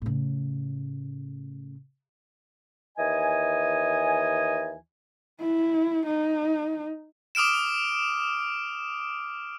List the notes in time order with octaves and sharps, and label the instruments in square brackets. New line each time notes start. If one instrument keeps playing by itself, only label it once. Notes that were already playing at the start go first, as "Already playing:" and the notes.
[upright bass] A2 C#3
[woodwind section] D#2 E3 D#5 G#5
[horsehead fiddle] E4
D#4
[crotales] D6 D#6 F6 D7 E7